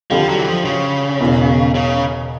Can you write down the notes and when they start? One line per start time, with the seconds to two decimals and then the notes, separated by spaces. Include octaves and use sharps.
0.10 F2 D3 F3 G3
0.29 F#3
0.38 E3
0.47 F3
0.65 C#3
1.20 E1 E2 B2
1.75 C#3